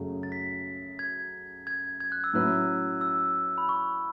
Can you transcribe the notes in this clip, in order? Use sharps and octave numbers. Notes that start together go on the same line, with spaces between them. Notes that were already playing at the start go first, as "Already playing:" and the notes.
Already playing: F#2 C#3 F#3 A3
A6
B6
G#6
G#6
G#6
F#6
E6
A2 F#3 C#4 E4 B4 F#6
E6
B5
C#6